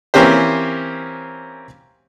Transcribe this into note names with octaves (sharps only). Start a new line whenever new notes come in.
E3 A#3 C4 C#4 G4 C5